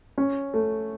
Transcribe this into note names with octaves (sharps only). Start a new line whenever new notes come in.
C#4
A3